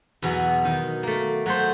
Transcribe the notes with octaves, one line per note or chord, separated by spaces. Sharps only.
E2 B2 F#3
D#3
A3 A#3
F#3 A3 C5